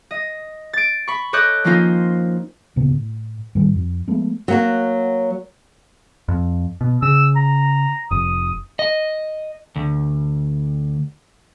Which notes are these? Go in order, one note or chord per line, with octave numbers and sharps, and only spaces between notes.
D#5
A6 D7
B5 C#6
A4 C#5 D#5 D6 F#6 G6
F3 A#3 C#4 D#4 F4 C5
D2 A#2 C#3 B3
A2
A2 D#3 G3
F2
F3 G#3 A3 B3
F#3 A#3 F#4
F2
B2
C#3 E6
A#5
F1 D#6
D#5
D2